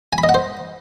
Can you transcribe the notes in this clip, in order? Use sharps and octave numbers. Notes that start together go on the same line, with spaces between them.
G#5
B5
D#5
F#5
C5